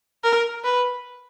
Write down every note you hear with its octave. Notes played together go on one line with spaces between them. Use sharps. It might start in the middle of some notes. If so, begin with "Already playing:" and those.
A#4
B4